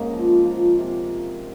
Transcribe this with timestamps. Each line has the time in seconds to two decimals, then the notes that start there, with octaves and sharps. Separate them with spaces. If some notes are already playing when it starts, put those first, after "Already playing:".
Already playing: G#2 A#3 C#4 D#5 F5
0.11 F3
0.45 F3
0.78 C3